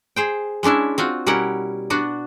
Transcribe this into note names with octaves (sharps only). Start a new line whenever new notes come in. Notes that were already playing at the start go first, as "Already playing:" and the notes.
G#4 C5 G5
G#3 C#4 D4 E4 E5
C4 F4 F#4
B2 G3 C#4 E4 A#4 F#5
B3 D4 F#4